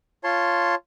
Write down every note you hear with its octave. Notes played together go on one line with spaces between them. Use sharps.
F4 C#5 A5 C6